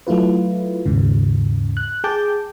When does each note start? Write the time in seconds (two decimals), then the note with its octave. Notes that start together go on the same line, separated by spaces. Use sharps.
0.07 F#3 A3 E4 F4 B4
0.86 D#2 G#2 C#3
1.77 F#6
2.04 G#4 G5 A5 D6 G6